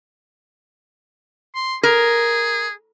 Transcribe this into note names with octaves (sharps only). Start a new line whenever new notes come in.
C6
G#4 A#4